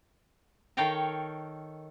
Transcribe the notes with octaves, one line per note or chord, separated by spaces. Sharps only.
D#3 A4 C#5 F5 G5 A#5